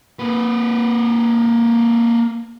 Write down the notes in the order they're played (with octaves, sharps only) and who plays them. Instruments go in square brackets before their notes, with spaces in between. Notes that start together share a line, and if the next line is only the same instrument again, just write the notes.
[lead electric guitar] A#3 B4